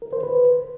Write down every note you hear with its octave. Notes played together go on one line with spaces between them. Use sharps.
A#4
C5
B4